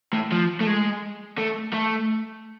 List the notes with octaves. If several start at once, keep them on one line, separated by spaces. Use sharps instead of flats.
A2
F3
A3
G#3
A3
A3